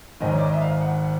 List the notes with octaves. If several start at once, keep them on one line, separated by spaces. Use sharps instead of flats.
G#1 G#2 D#3 D#5
C#5
D5
D#5
E5
F5
F#5